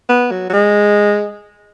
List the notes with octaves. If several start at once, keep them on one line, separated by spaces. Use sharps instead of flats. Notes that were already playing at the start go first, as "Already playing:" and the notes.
B3
F#3
F#3
G#3